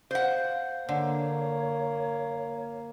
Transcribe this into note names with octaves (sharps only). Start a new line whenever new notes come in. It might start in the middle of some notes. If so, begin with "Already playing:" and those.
C5 F5 F#5
D3 A#3 C#5